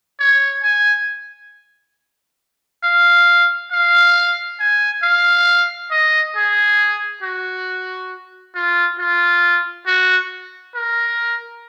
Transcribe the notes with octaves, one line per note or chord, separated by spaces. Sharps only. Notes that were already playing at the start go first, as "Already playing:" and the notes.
C#5
G#5
F5
F5
G#5
F5
D#5
G#4
F#4
F4
F4
F#4
A#4